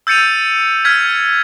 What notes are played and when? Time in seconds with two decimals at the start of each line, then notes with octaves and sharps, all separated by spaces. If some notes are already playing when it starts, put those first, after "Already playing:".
0.07 E6 G6 A6 C#7 D#7 F7
0.85 F6 G#6 B6